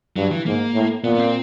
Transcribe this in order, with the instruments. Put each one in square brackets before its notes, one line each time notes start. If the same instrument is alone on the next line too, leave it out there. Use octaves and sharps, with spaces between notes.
[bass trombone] G2 [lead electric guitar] F#3
[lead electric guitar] E3
[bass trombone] G#2 [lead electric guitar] A#3
[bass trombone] A2
[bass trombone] A#2 [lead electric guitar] B3
[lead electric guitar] B3
C4